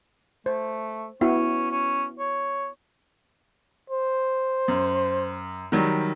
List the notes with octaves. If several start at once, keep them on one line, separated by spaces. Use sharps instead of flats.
A3 C5
B3 C#4 E4 F#4
C#4
C#5
C5
F#2
D#3 F#3 G3